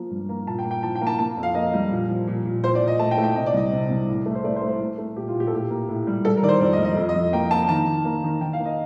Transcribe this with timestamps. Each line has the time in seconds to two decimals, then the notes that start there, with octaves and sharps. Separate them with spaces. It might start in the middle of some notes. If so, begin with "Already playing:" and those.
Already playing: F3 A#3
0.10 G2
0.29 A#3
0.47 A#2 A5
0.59 G5
0.64 A#3
0.71 G5
0.83 F3 A5
0.95 G5
1.01 A#3
1.07 A5
1.19 A#3 A5
1.37 F2
1.43 F5
1.55 A#3 D#5
1.73 G3
1.91 A#2
2.09 F3
2.27 A#2
2.45 A#2
2.63 A#2 C5
2.75 D5
2.82 A#2
2.88 D#5
2.99 A3 A5
3.11 G5
3.18 A3
3.24 G5
3.35 C3 D#5
3.46 D5
3.54 C2 D#5
3.72 C3
3.90 C2
4.08 A2
4.26 A3
4.35 C5
4.44 A3 D5
4.56 C5
4.62 A3
4.68 C5
4.80 A3
4.98 A3
5.16 A#2 G4
5.28 F4
5.34 A#2
5.40 G4
5.47 A4
5.53 A2 G4
5.70 A#3
5.89 A2
6.07 G3
6.25 G3 A4
6.37 A#4
6.43 D#3 D5
6.48 C5
6.60 F2 D5
6.73 D#5
6.79 G3
6.85 D#5
6.97 F2
7.09 D#5
7.15 F2
7.33 A#3 G5
7.51 A#3 A5
7.69 D#3 A5
7.87 D#3
8.05 A#3
8.23 D#3
8.41 D#3 G5
8.53 F5
8.60 A#3
8.65 D#5